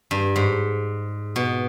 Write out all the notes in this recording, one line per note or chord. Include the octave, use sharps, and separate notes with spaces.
G2
G#2
B2